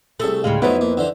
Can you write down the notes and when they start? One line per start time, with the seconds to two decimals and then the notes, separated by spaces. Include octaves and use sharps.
0.20 C2 A3 G#4 A4
0.44 D2 A2 C#3 G3 G#3 F5
0.62 F2 F#3 A3 B3 D#4 E4 B4 C5
0.81 A#3
0.97 D3 E3 C5